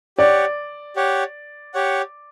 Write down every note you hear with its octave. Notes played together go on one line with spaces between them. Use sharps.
G4 C#5 D5 F#5
G4 C#5 F#5
G4 C#5 F#5